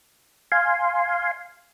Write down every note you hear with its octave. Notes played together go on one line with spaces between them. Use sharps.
F5 G#5 C6